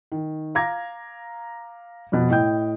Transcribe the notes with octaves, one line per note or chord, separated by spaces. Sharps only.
D#3
F5 A#5 D6 G#6 A#6
F2 B2
A2 D#5 G5 G6